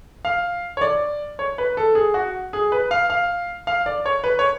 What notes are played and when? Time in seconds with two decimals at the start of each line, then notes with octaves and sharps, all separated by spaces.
0.25 F5
0.77 C#5
0.81 D5
1.39 C#5
1.58 B4
1.77 A4
1.95 G#4
2.14 F#4
2.53 G#4
2.72 B4
2.91 F5
3.10 F5
3.67 F5
3.86 D5
4.06 C#5
4.24 B4
4.39 C#5